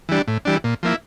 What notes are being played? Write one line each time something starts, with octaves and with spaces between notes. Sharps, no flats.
E3 G3 D4
A2
E3 G3 D4
A#2
F3 A#3 E4